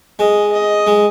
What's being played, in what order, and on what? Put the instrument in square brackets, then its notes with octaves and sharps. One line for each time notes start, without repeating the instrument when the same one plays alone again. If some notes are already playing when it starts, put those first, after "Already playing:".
[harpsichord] G#3 [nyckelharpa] D#5
[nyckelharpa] D#5
[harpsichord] G#3